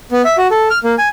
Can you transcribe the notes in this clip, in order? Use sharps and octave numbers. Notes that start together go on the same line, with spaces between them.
B3
E5
F#4
A4
F6
A#3
G#5